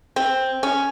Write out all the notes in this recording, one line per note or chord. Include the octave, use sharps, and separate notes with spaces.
C4
C#4